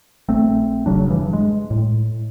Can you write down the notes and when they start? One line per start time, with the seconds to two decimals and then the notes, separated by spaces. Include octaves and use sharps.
0.29 A#1 A3 C4
0.86 E1 C#3 F#3 D4
1.07 G2 E3
1.33 G#3
1.71 A2